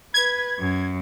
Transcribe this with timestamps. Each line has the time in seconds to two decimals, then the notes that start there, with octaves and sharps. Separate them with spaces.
0.14 B4 G#6
0.59 F#2